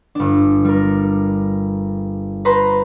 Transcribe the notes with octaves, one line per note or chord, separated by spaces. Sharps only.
G1 D4
G3 A#4
B4 C5 A#5 C6